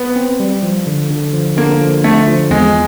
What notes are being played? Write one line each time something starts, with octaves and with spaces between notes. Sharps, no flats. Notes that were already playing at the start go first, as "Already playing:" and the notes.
Already playing: B3
C4
G3
F3
D3
D3
F3
D3 A#3
F3
D3 A3
F3
E2 G#3